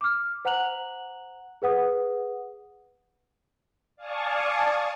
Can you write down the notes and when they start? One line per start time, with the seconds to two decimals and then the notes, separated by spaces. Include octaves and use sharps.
0.01 D6 F6
0.45 C5 F#5 A#5 F#6 F7 F#7
1.62 G#4 B4 F#5 D#6
3.96 D5 F5 G#5 A5 C#6 D#6